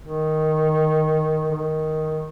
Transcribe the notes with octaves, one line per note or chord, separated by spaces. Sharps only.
D#3
D#3